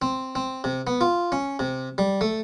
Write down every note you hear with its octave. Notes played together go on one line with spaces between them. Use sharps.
C4
C4
C3
B3
F4
C#4
C3
G3
A3